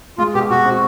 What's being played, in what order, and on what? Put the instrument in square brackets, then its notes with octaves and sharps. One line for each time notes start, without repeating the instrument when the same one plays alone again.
[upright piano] G#3 [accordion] F4
[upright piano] B2 [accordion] G4
[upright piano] B2 [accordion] F#4
[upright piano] C4